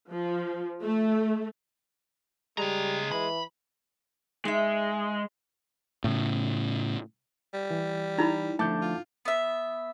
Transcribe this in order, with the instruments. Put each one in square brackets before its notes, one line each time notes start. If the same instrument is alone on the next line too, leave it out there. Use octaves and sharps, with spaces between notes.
[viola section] F3
A3
[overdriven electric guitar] C#3 A#5 [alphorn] G3 [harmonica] G#3
[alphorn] E3 [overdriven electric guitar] B5
[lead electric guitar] G#3 [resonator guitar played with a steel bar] D#4 E5
[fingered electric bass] A2 C#3
[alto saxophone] G3
[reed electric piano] E3
[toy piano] D#4 E4 B5 [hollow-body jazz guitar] A#5
[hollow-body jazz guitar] D3 F3 A3 [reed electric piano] A5 D6 G6
[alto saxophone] F4
[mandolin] B3 E5